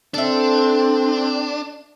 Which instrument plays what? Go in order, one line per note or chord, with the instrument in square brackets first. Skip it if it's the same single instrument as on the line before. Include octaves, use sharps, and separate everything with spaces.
[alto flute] C4 [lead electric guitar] D4 [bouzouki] A4 E5